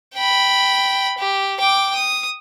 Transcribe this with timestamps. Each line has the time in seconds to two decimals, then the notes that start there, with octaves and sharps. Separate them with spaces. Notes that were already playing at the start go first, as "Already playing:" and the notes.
0.15 G5 B5
1.18 G4
1.60 G5 D6
1.95 D#6